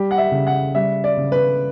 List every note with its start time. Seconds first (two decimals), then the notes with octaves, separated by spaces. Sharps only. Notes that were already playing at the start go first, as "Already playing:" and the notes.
Already playing: G3 G4
0.11 F#5
0.18 E5
0.32 C#3
0.47 F#5
0.75 G3 E5
1.04 D5
1.17 C#3
1.32 B4